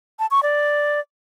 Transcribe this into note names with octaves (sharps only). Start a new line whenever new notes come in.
A5
C#6
D5